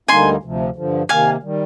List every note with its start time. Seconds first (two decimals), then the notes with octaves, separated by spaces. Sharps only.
0.08 D2 D3 G3 A#3 D#4 G#5 C6
0.43 D2 C3 F3
0.76 G2 D3 F3
1.09 C3 D#3 A#3 F5 G#5
1.43 D#3 G3